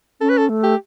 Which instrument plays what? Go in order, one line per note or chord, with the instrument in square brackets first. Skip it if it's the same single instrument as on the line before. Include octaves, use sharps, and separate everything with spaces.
[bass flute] C#4 [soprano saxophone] A4
[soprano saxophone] B4
A4
[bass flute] A3
[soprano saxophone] G4